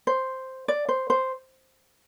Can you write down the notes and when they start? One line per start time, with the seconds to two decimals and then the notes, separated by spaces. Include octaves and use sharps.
0.07 C5
0.68 D5
0.89 C5
1.10 C5